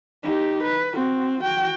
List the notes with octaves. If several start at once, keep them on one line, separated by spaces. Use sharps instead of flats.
D#4 G4
B4
C4 F#4
F#4 G5